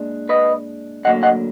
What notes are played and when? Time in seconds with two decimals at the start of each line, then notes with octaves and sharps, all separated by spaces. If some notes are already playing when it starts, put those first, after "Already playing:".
Already playing: A#2 G#3 D4
0.29 B4 D#5
1.04 D2 D3 F#3 A#3 D#5 F#5
1.23 D#5 F#5